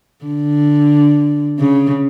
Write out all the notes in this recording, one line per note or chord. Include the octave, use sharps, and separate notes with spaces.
D3
C#3